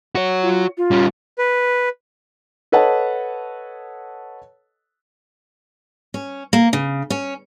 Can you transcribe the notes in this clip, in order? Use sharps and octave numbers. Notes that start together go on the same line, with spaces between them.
F#4 C#5
F4
F4
G3 C#4
B4
A4 B4 C#5 D#5 F#5 A5
C#4
A#3
C#3
C#4